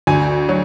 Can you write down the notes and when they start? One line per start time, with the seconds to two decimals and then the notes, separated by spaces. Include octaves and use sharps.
0.07 D2 G#5
0.49 F#3